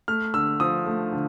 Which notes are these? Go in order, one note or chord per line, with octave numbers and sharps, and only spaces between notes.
A3 F6
D3 E6
F3 D#6
A3
D3